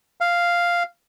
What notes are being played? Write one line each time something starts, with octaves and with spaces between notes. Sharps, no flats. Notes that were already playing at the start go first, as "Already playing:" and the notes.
F5